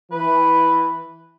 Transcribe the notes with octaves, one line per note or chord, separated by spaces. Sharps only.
E3 B4